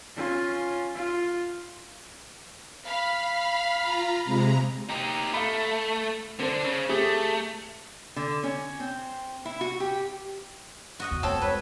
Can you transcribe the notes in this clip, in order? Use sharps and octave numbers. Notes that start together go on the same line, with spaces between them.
C#4 F4
F4
F5 B5
F4 A#5
C3 G#3 A#5
D#4 G4
A3 F5 B5
D3 C4 D4 C5
C#3
A3 G4 G#4
D3
C#4
C4
E4
F#4
G4
F#4 D#5 F#5
E2 C#3
F2 A3 C4 A4 C#5
G#3 E4 B4 C#5